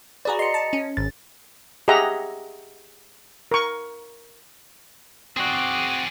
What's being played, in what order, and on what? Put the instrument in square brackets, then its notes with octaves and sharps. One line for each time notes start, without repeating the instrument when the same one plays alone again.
[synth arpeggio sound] F#4 G#4 B4 [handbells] D5 A#5
[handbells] D#5 C#7 [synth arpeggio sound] C6
[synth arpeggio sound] A5
C#4
[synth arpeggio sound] G#1 [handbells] A6
[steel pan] G4 G#4 D#5 E5 F#5 A#5
A#4 C#6
[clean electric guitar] C4 F#4 [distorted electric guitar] G#4 D5